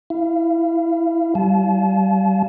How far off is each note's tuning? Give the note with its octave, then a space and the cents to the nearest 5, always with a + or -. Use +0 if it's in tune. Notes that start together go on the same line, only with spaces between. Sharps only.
E4 +0 F5 -30
G3 -25 F5 +0 A5 -40